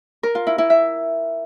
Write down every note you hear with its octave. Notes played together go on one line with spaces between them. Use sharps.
A#4
F4
E4
E4
E5